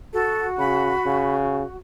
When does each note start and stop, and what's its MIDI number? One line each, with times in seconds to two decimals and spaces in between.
0.13 1.74 66
0.13 0.47 69
0.59 0.92 49
0.59 1.33 83
1.06 1.63 49